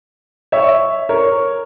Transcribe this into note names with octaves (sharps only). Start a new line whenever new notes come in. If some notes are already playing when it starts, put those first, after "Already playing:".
C#5 E5
A#4 C#5